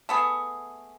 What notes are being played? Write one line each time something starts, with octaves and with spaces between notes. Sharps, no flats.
A3 B3 G#4